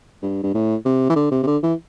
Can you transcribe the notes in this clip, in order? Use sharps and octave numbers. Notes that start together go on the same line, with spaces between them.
G2
G2
A2
C3
E3
D3
C3
C3
D3
E3